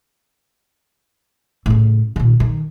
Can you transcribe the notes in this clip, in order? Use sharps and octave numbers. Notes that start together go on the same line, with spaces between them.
A2 C#3
A#2 D#3
D#3